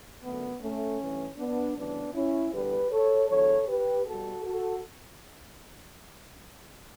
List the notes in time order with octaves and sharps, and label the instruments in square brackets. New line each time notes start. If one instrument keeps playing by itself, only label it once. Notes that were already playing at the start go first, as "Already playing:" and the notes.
[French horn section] F#2 D3 A3 B3
A3 C#4
G2 E3 A3
B3 D4
D2 C#3 E3 G3 B3 D4
C#4 E4
E2 D3 G3 G4 B4
A4 C#5
E2 D3 F#3 A4 C#5
G4 B4
B2 G3 F#4 A4
F#4 A4